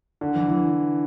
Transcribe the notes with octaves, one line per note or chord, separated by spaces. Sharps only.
D3
E3
E3